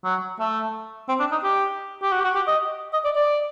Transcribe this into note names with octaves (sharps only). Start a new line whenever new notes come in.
F#3
A3
C4
D4
D#4
G4
G4
F#4
G4
F#4
G4
D#5
D#5
D5
D5